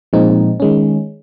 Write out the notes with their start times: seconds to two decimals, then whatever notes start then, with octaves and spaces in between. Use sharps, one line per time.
0.13 A#2 F3 G#3 C4 D#4
0.60 D#3 G#3 C#4